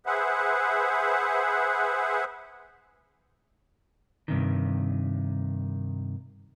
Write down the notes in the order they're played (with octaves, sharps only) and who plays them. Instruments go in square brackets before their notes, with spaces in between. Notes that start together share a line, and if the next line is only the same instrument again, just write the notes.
[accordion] G#4 B4 C5 E5 F#5
[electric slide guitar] G2 C3 D#3